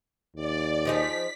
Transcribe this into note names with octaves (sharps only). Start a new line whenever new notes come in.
D#2 D5
F3 D#4 G#4 B6